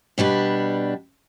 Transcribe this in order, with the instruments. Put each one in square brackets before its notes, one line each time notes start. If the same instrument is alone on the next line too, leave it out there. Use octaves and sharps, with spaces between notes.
[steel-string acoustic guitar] B2 G3 D4 B4